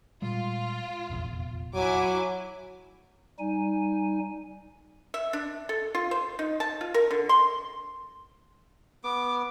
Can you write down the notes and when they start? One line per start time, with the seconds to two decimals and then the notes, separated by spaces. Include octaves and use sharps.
0.22 A#2 G3 G#3 F4
1.10 F1 A#1 E2
1.74 F#3 E4 G#5 D6
3.39 G3 D#4 G#5
5.14 E5
5.33 D4
5.69 A4
5.95 F4
6.11 C5
6.39 D#4
6.60 A5
6.81 F4
6.94 A#4
7.11 D3
7.29 C6
9.04 B3 D6